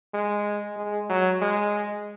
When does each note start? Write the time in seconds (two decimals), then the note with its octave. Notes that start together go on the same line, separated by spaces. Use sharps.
0.14 G#3
0.77 G#3
1.09 F#3
1.42 G#3